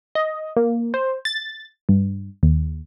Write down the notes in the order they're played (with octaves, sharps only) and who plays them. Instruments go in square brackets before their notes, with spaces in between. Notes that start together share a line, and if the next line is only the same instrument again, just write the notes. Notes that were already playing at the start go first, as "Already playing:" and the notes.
[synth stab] D#5
A#3
C5
A6
G2
D#2